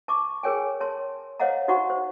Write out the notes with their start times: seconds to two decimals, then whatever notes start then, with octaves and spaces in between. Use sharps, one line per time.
0.08 A5 C#6 D6
0.43 G#4 A#4 C#5 G5 G#5
0.80 C#5 A5 C6
1.40 C5 C#5 D#5 F5 F#5 A#5
1.68 D#4 F#4 C5 F#5 A#5 C#6
1.90 C5